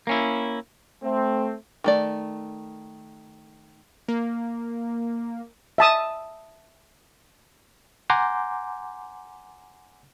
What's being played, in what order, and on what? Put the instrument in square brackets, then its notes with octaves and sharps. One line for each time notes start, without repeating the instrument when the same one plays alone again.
[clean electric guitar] A#3 C#4 E4
[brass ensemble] A3 C4
[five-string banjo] D#3 A3 D5
[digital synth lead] A#3
[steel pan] E5 A5 D#6
[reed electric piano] F#5 G#5 A#5 C6 D6 G6